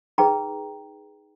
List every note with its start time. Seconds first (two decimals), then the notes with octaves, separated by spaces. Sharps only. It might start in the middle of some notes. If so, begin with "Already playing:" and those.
0.18 D#4 G#4 B4 G5 A#5